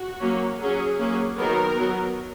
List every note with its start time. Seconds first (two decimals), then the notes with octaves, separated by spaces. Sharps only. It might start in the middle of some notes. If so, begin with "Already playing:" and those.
Already playing: F#4
0.20 F#3 A#3 C#4
0.60 F#3 C#4 G#4
0.99 F#3 A#3 C#4
1.37 D#3 F#3 B3 A#4
1.76 F#3 B3